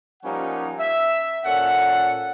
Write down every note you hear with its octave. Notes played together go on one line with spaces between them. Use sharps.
F3 G3 A#3 C#4 D#4 F#5
E5
A#2 C#4 A4 F#5